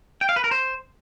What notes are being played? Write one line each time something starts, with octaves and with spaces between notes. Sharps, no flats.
G5
F5
B4
A#4
C5